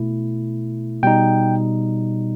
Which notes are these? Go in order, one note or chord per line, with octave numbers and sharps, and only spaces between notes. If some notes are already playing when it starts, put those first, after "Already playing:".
Already playing: B2 A3 E4
B2 G3 D#4 G5